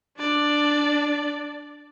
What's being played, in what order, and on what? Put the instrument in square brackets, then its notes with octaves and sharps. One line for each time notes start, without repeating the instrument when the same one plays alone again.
[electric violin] D4 D5